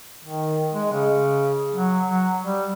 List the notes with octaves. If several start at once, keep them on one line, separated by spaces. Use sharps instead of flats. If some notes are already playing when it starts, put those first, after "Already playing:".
D#3
G#3
C#3
F#3
F#3
G3